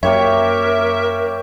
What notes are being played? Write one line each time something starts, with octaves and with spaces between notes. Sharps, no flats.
F#2 A#3 G4 A#4 C#5 E5